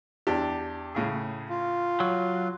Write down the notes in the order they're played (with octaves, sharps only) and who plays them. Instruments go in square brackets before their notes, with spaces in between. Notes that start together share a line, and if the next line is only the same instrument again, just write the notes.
[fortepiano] E2 D4 G4
A2 C#3 G#4
[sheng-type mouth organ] F4
[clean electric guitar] F#3